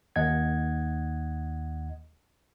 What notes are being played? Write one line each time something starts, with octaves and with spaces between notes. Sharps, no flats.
D#2 D#5 F#5 G#6